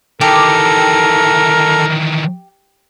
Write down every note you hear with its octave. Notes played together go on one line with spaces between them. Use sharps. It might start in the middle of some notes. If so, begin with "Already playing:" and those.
D#3 E3 G4 A4 A#4